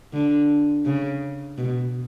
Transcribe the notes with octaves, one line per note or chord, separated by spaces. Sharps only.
D3
C#3
B2